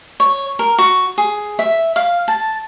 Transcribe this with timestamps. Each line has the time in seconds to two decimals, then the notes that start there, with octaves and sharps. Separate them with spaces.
0.20 C#5
0.59 A#4
0.78 F#4
1.18 G#4
1.59 E5
1.96 F5
2.28 A5